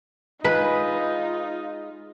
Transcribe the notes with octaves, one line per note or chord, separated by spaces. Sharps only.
G#3 D#4 F4 B4